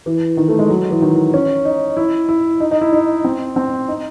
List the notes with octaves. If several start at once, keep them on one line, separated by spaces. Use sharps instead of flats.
E3
D#3
A3
G#3
F#3
E3
D#3
C#4
D#4
E4
E4
D#4
D#4
E4
D#4
C4
C4
D#4